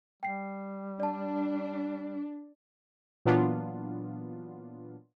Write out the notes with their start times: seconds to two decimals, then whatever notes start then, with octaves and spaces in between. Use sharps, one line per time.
0.23 G3 G5 C7
1.00 D4 D5 A5
3.25 A#2 E3 F#3 B3 D4 F4